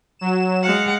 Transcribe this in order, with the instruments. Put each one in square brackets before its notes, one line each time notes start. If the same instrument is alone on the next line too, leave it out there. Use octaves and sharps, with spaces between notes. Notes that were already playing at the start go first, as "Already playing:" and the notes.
[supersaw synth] F#3 E7
[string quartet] G#3 F5 F#5